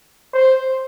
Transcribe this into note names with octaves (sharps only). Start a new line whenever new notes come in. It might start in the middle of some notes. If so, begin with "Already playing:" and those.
C5